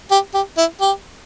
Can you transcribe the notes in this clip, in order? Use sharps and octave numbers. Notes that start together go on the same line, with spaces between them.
G4
G4
E4
G4